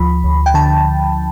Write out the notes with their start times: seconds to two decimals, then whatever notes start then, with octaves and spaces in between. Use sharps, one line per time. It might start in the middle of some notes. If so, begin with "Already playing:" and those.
Already playing: D2 F3 B5
0.24 D2
0.46 G5
0.54 D3 A5